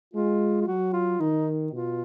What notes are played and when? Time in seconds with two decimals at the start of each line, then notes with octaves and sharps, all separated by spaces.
0.14 G#3 F4
0.61 F4
0.67 F#3 F#4
0.93 F4
1.20 D#3 D#4
1.72 B2 F4